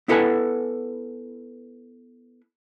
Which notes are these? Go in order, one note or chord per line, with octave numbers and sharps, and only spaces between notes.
B3 E4 A4 B4 F#5 G#5